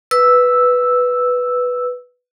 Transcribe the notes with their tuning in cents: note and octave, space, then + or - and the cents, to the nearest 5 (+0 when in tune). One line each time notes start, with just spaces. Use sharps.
B4 +0 E6 +0